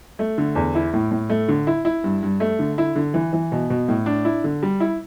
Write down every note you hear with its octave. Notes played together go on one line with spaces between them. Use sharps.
A3
D3
E2
E4
A2
A2
A3
D3
E4
E4
G2
G2
A3
D3
E4
D3
E3
E3
B2
B2
A2
D4
E4
D3
G3
E4